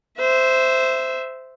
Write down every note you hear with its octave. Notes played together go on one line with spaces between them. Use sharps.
C5 E5